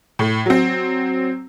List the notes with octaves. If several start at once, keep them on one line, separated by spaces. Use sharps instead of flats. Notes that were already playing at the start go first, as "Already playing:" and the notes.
A2
F#3 C4